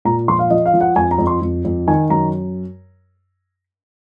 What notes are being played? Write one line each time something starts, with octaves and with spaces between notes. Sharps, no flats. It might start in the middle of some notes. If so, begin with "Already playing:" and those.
A#2 A#5
F3 C6
F5
F3 D#5
F5
F3
F#5
F2 G#5
A#5
F2
C6
F2
F2
D#3 G#5
F#2 A#5